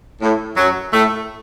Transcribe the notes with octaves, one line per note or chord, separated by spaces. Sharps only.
A2
F#2 F#3
A2 A3